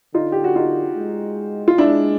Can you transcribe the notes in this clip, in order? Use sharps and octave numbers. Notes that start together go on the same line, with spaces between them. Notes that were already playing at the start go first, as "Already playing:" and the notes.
D3 D#4 F4
G4
F#4
D#4 F4
G#3
F4
G#3 D4 E4